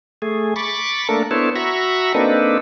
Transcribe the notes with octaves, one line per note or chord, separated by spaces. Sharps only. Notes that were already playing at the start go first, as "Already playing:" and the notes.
A3 G#4
B5 C#6 D6 A6
A3 A#3 D4 A4 A#4
B3 D4 E4 A4 C5 C#5
F#4 E5 A#5 B5 C#6
A#3 C4 D4 D#4 A4 B4